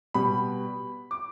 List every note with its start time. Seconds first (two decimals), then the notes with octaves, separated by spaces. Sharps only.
0.14 B2 G3 B3 B5
1.11 D6